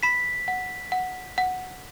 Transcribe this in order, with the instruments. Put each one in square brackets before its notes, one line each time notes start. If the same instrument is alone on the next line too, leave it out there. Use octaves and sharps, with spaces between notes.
[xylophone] B5 [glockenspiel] B6
[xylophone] F#5
F#5
F#5